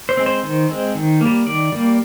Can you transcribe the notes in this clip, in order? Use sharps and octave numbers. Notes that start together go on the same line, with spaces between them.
C5
G#3 C4
C5
D#3
G#3 C4
D#3
G3 A#3
D#3 D5
G3 A#3